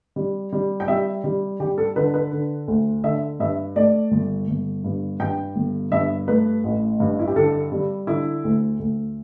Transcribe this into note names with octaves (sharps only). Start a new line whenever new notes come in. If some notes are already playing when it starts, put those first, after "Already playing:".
G3
G3
G5
G3 E5
G3
G3 G4
A4
D3 B4
B4
D3
D2
D3 E5
G2 E5
A3 D5
G1
G1
G2
G2 G5
G1
G2 E5
A3 B4
A1
G2
E4
G4
D3 A4
G3
D3 E4
D2
D2